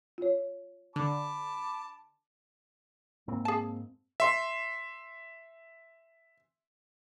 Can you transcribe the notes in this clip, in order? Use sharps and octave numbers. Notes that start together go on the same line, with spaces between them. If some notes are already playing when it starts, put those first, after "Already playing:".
F4 C#5
D3 A5 B5 D6
G#2 A#3 C4
G#4 A5
E5 C6